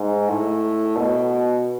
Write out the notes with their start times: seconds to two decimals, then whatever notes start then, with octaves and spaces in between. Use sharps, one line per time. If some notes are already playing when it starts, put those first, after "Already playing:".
Already playing: G#2
0.28 A2
0.97 B2